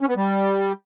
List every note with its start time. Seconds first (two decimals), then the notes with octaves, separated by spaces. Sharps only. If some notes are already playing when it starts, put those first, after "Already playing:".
0.01 C#4
0.09 B3
0.17 G3